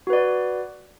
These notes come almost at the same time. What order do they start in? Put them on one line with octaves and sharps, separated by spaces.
F#4 B4 D5